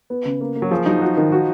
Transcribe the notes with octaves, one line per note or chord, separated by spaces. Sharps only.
B3
C#3
A#3
A#3
F#3
F3 G#4
F#3 D#4
F#4
D#3
F#4